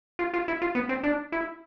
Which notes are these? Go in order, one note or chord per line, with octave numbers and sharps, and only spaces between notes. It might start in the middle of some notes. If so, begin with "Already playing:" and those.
F4
F4
E4
F4
B3
C4
D4
E4